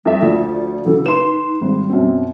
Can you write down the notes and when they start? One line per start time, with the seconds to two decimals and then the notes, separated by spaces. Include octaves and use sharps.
0.05 F2 G3 E5
0.22 D2 F3 D5
0.85 C#3 E3 F#3 A4
1.06 D#4 B4 C6 E7
1.61 G#1 G3
1.89 F#2 B2 C4